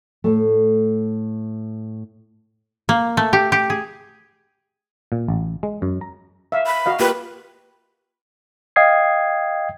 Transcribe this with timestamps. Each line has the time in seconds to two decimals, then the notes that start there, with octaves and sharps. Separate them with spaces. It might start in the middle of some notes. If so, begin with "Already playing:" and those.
0.24 A2 A3
2.89 A#3
3.17 A3
3.33 G4
3.52 G4
3.70 G#4
5.12 A#2
5.28 A1
5.63 G#3
5.82 F#2
6.01 A#5
6.52 E5 F5
6.66 B5
6.86 F#4 D#5 F5
7.00 A#3 F4 G4 B4
8.76 D#5 F5 G5 D#6 G#6 C7